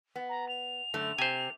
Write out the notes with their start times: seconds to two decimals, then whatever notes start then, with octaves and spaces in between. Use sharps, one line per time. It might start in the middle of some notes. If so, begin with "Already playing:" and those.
0.16 B3
0.29 A#5
0.48 F7
0.94 F#2 D3 A3
1.18 C3 C5 G#5